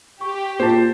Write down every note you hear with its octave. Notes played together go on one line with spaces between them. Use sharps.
G4 C#6
A#2 F4 F#4 G#4 C5 A5